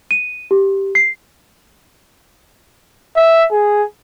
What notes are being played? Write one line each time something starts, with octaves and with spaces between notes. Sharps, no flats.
D#7
G4
C7
E5
G#4